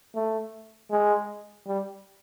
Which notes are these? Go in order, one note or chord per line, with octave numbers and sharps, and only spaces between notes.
A3
G#3
G3